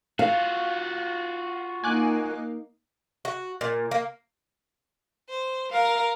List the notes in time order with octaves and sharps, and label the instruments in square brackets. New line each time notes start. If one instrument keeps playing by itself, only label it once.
[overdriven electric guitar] F4 F#4 [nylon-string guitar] F5
[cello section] A#3 D#4 [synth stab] G#5 D6 F#6
[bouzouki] F#4
A#2
A#3
[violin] C5
[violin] A#4 [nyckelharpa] F5